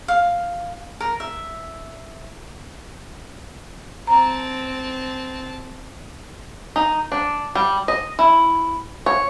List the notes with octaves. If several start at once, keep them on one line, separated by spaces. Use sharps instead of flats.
F5
A#4
E5
C4 A5 A#5
D#4
D4
G3
D#5
E4
C#5